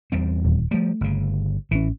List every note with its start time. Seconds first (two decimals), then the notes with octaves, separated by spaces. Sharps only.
0.12 E2 G3 C4
0.44 D#1
0.71 F3 G3 A3
1.01 G1 C#3
1.71 A1 E3 C#4